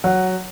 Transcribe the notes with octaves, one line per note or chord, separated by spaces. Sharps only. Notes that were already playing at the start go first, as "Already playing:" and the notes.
F#3 F#5